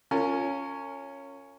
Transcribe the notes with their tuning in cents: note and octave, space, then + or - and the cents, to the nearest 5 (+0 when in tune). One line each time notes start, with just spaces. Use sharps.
C#4 +0 F4 +0 A#4 -40